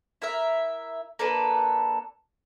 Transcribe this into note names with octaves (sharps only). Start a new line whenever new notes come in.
E4 A#4 E5
A#3 D4 A4 B4